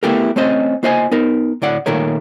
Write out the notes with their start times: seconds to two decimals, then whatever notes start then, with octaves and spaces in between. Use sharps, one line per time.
0.03 A3 B3 E4 G4 A4 A#4
0.36 A3 C4 C#4 C5 D#5
0.83 A#3 F4 C5 D#5 F5 G#5
1.11 B3 D#4 A#4
1.62 D2 A2 D5 F#5
1.86 A#2 D#3 A3 A#4 C#5